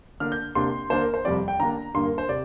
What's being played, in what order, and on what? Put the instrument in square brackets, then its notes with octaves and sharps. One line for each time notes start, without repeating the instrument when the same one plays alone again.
[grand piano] D3 A#3 D4 F6
G6
C3 A#3 D4 C6
D3 A#3 D4 C5
A#4
C5
F2 C3 G3 C4 D5
G5
D3 A#3 D4 A#5
G2 D3 A#3 C6
A#4
C5
C3 D5